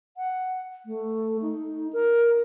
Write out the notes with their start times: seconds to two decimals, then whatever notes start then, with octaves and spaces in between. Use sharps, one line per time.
0.17 F#5
0.86 A3
1.42 D#4
1.93 A#4